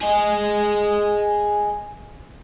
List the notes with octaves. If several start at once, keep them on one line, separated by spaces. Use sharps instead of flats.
G#4 D#5